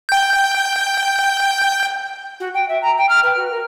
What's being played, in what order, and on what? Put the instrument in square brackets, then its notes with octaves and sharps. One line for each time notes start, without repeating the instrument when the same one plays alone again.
[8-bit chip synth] G5 G6
[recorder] F#4
G5
E5
A#5
G5
F6
B4
F#4
A#4